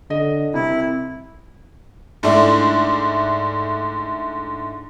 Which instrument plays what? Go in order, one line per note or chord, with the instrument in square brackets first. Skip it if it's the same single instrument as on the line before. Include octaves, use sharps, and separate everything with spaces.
[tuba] D3 [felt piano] D#5
[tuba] C2 [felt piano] C3 [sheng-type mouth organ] E4
[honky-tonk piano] G#2 A3 D4 E4